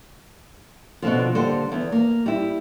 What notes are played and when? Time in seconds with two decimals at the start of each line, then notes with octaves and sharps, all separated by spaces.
1.02 B2 D3 F3
1.35 D3 G3 A#3 A4 C5
1.72 E2
1.92 A#3
2.26 G3 E4